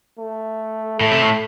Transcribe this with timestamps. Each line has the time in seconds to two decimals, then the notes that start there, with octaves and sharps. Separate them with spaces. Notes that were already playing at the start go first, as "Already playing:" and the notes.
0.19 A3
1.00 A2 A3
1.11 C3
1.22 A2